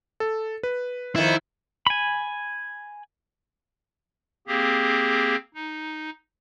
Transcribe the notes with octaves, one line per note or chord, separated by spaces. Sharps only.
A4
B4
F2 D#3 F3 E4
G#5 B5
A#3 C4 G4 G#4
D#4